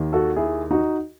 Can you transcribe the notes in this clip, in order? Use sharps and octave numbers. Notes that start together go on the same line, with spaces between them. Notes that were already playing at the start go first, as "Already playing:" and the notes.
Already playing: D#2 D#3
F#4 A4
E4 G#4
D#4 F#4